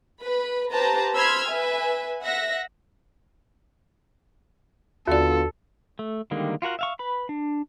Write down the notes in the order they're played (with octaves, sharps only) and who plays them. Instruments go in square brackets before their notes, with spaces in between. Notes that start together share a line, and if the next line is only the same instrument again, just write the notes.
[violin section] B4 B5
G4 B4 C5 A5 A#5
C5 B5 C6 E6 F6 G#6
B4 E5 G#5
E5 F#5 A#6
[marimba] D#2 D5 [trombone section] D3 B3 F4 [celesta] F#4 [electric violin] A4
[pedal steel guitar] A3
D3 D#3 G3 G#3 A#3
F4 F#4 A#4 F#5
E5 F5 C#6
B4 B5
D4